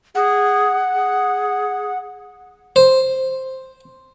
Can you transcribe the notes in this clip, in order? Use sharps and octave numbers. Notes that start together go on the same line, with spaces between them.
G#4 F#5
G#4
C5